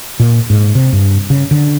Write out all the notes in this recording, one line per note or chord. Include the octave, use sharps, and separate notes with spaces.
A#2
G#2
C3
G2
C#3
D3